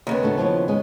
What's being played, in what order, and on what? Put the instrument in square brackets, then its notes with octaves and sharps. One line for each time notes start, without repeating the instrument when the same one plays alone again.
[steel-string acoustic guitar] D#2 C#3 B3
[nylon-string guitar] A3 D4 F#4
F3 E4 C#5
G#3 C#4